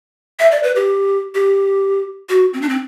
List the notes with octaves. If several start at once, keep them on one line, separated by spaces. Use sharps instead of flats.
E5
D5
B4
G4
G4
F#4
C4
D4
C4